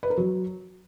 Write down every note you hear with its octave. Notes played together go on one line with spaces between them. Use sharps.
B4
A#4
F#3